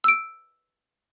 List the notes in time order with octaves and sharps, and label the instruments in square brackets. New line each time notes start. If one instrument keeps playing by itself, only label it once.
[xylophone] E6 D7